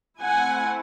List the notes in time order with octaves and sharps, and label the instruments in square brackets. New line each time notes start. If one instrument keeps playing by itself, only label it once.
[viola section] A3 C4 E4 F#5 G#5